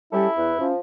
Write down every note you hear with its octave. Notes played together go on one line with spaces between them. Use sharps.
G3 C#4 E4 G4 A4
E2 B4
F3 C#4